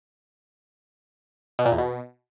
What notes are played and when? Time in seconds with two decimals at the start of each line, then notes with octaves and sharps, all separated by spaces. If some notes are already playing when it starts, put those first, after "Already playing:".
1.59 B2
1.65 A#2
1.72 E2
1.78 B2